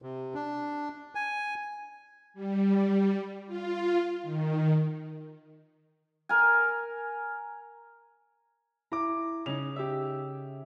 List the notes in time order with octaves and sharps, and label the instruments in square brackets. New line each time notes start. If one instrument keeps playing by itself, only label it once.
[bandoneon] C3
D4
G#5
[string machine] G3
F4
D#3
[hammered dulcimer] A#4 G#5
[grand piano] E4 D6 [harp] A#5
[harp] C#3 C#4 D#4 [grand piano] F7
[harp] G4 E5